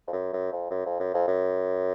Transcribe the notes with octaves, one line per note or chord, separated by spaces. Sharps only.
F2
F#2
F#2
F2
F#2
F2
F#2
F2
F#2